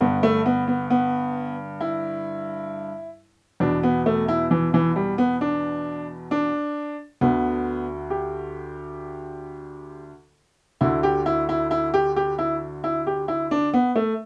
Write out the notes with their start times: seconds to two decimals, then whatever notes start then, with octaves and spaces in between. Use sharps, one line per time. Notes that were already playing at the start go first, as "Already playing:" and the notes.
0.01 G2 D3 B3
0.23 A3
0.46 B3
0.68 B3
0.90 B3
1.81 E4
3.60 E2 B2 D4
3.83 B3
4.06 A3
4.28 E4
4.51 E3
4.74 E3
4.96 G3
5.18 B3
5.41 D4
6.31 D4
7.21 D2 D3 B3
8.10 G4
10.81 D2 D3 E4
11.03 G4
11.26 E4
11.49 E4
11.71 E4
11.94 G4
12.16 G4
12.39 E4
12.84 E4
13.07 G4
13.28 E4
13.51 D4
13.74 B3
13.96 A3